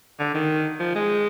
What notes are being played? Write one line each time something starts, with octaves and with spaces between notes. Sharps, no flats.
D3
D#3
F3
G#3